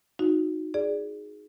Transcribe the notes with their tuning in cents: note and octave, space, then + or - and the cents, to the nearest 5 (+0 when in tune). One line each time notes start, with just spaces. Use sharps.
D#4 +0 F#4 -20
G#4 +0 D5 +0